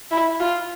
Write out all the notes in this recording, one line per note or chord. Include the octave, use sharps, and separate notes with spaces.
E4
F4